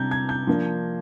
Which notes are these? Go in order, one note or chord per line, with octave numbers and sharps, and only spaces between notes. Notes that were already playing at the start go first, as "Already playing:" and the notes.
Already playing: C3 G3 A#5 G6 G#6
G#6
G6
F3 A#3 D4